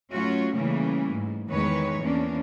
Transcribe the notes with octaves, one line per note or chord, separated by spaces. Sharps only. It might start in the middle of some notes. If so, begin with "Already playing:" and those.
F#3 A3 C#4 F4 F#4
C#3 E3 G3 A3 A#3 C#4
G#2
E2 D#3 G#3 B4 C#5
E2 A#3 C#4 D4